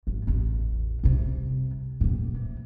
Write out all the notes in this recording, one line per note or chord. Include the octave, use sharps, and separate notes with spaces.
G#1
A1 E2
C2 C3
E2 A#2
C3